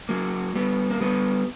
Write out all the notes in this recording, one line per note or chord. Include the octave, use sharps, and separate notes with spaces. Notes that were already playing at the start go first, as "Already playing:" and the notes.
F#3 A#3
G3 B3
A#3
G3 B3